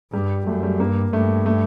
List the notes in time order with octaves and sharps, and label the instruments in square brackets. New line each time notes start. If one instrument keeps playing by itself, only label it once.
[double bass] G2 [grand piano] G3
[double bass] F#2 [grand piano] A3
[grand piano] G3
[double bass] G2 [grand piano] A#3
[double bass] G2 [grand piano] A3
[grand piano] A3